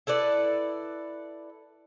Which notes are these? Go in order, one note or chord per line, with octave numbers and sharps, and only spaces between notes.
E4 A4 B4 D5